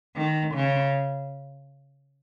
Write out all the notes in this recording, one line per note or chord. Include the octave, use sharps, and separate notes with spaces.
D#3
C#3